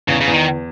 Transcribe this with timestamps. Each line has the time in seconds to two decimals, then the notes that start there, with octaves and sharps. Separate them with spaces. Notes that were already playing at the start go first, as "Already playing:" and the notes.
0.08 E2 C#3
0.21 C#3
0.27 E2
0.34 D#3